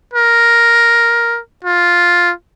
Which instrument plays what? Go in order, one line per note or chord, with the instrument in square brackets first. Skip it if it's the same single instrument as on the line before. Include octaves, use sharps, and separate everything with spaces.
[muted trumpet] A#4
F4